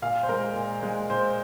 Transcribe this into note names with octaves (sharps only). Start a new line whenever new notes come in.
A#2 F5
C5
G#3 A#4
A#2
G#3
A#2 C5